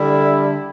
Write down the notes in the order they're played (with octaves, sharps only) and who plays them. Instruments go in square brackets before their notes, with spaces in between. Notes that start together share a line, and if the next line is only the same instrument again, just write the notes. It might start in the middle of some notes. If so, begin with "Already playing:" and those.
Already playing: [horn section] D3 G3 E4